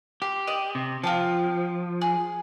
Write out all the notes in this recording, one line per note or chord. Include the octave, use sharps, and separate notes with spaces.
G4 C6
D5 D#5
C3
F3 F4 G5 A5
G#4